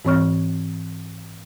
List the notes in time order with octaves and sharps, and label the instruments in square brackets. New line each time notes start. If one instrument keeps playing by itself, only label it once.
[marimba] G#2 E3 C4 C#5 C#6 F6